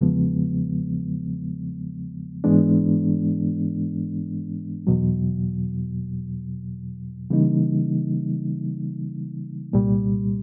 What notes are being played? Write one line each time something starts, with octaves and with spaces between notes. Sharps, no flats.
E2 C#3 F3 G#3 B3
G#2 E3 G#3 B3 D4
E2 B2 F#3
C#3 E3 G3 A#3 D#4
C2 A#2 G3